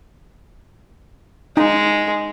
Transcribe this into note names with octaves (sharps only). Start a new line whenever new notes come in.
G#3 D#4